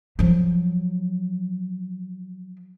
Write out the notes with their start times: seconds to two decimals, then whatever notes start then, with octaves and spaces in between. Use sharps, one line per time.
0.19 F3 F#3